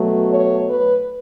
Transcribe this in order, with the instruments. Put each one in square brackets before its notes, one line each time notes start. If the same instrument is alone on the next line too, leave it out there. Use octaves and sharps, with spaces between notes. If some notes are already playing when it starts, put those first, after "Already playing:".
Already playing: [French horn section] B2 F#3 A3
C#5
B4